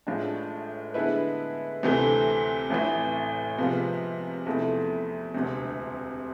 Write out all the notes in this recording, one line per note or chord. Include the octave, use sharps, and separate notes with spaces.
A1 A2 G#3 D4 F4
D3 G#3 B3 E4 B4
D2 C3 E3 A3
A1 A2 E3
C3 F3 G#3 B3 F4
E2 C3 F3 A3 E4
E1 D2 C3